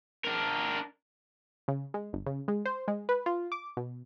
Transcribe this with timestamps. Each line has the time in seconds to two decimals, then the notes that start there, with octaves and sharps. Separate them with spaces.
0.24 D4 A#4
1.68 C#3
1.94 G#3
2.13 G1
2.26 C#3
2.48 G#3
2.66 C5
2.88 G#3
3.09 B4
3.26 F4
3.52 D6
3.77 B2